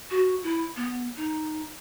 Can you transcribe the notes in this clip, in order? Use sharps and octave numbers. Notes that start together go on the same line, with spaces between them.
F#4
E4
B3
D#4